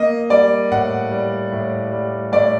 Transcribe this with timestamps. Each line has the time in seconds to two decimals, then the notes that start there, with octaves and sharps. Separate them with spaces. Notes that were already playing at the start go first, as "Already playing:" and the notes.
Already playing: A#3 D#5
0.30 G3 D5
0.71 A2 F#5
1.11 G3
1.51 A2
1.92 G3
2.32 A2 D5